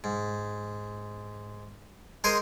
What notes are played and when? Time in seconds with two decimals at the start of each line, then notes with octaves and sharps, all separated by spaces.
0.04 G#2
2.24 G#3 A#4 C5 G#5 C6 D#6